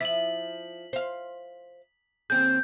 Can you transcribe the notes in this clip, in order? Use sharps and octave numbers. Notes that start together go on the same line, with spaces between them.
F3 E4 B6 F#7
C5 F5
D#2 C4 G#4 G6